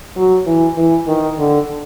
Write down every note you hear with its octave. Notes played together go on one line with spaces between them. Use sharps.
F#3
E3
E3
D#3
D3